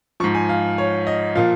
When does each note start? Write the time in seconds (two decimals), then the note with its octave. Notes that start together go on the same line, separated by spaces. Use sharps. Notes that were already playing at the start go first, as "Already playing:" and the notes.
0.20 F3 C#6
0.24 G#2
0.35 G#5
0.49 F5
0.78 C#5
1.07 D#5
1.35 A#2 F3 F5